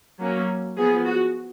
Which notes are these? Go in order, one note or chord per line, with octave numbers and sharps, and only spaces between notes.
F#3 A#3 C#4
F3 B3 G#4
F#4